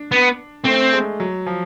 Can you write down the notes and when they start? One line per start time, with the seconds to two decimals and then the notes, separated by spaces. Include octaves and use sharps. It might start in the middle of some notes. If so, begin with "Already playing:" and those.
Already playing: D4
0.12 B3
0.65 A3 C4
0.93 G#3
1.20 F#3
1.46 F3